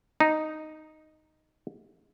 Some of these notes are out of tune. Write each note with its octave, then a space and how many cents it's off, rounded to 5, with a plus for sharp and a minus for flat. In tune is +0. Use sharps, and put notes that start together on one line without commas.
D#4 -5